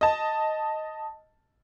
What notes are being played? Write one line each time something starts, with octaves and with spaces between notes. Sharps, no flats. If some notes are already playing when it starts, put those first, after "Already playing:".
D#5 A5